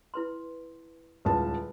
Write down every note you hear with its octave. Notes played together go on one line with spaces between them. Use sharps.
E4 B4 C6
D#1 C#2 E4 B4 A5